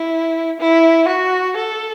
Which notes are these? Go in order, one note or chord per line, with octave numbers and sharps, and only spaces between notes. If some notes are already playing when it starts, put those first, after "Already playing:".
Already playing: E4
E4
F#4
A4